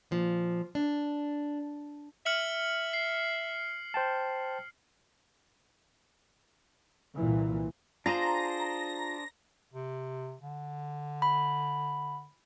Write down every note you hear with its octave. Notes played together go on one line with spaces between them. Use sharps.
A#2 F3
D4
E5 F6 C#7 F#7
C7
C5 G5 A5
C2 A#2 E3
D4 F4 G#4 C5 A#5 A#6
C3
D3
B5